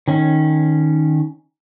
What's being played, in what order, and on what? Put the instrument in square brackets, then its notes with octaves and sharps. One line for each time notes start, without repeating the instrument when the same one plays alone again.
[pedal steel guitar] D#3 C#4